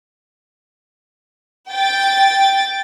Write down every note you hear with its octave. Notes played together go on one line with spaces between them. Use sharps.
G5 A6